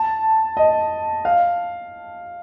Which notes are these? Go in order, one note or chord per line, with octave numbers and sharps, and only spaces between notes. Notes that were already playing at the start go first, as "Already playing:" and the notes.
Already playing: A5
D#5
F5